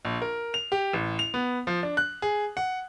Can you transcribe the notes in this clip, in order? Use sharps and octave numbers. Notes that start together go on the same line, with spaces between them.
A#1
A#4
F7
G4
A1
F7
B3
F3
D4
F#6
G#4
F#5